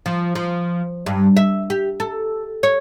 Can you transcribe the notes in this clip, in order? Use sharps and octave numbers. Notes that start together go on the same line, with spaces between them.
F3
F3
G2
E5
G4
A4
C#5